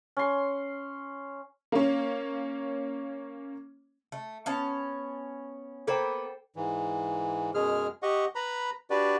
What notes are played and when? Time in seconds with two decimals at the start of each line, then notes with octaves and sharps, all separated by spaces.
0.17 C#4 C6
1.72 A#3 C#4
4.12 A3
4.46 B3 C#4 A5
5.87 A#3 B3 A4 B4 C5 G5
6.56 G#2 E3
7.54 F#2 B2 G#3 G#4 F6
8.02 G4 D#5 F#5 C#6
8.35 B4 A#5 B5
8.90 D4 F#4 G4 B4 D5